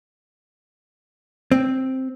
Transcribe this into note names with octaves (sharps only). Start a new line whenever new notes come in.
C4